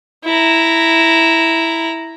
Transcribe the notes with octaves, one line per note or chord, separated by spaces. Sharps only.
E4 A#5